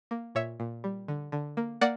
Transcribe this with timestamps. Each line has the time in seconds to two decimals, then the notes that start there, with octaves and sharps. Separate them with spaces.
0.11 A#3
0.35 A#2 C#5 E5
0.60 A#2
0.84 G3
1.08 D3
1.32 D3
1.57 A#3
1.81 A#3 D5 F#5